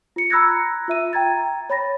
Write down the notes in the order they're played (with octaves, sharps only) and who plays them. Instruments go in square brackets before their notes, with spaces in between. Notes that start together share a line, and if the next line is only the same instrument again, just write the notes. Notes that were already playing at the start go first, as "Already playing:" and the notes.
[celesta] F4 C#7
A#5 B5 E6 F#6 G#6 A#6
F4 E5 D#7
G5 A#5 G#6 A6
C#5 B5 A6 A#6